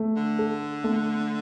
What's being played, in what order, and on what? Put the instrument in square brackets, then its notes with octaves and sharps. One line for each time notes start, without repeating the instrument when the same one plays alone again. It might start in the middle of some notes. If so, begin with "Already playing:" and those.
Already playing: [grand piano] A3
[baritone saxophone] D3
[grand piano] A4
A3